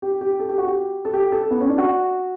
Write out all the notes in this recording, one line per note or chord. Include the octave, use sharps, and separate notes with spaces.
G4
G4
A4
G4
F#4
G4
A4
G4
A4
B3
C#4
D4
F#4